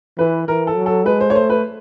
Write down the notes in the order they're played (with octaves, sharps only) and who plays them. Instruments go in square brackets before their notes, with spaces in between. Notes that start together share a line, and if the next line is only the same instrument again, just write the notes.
[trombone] E3 [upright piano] B4
[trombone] E3 [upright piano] A#4
[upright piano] A4
[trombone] F#3
[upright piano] A4
[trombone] G#3 [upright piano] B4
[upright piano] C5
C#5
[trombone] A3 [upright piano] C5
[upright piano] B4